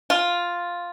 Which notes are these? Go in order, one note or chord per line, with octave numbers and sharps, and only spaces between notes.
F4